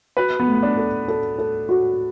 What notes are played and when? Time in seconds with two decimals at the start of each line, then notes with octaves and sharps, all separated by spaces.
0.17 F#4 B4
0.40 B3
0.47 A3
0.63 D4
0.77 A4
1.08 A4
1.39 A4
1.69 F#4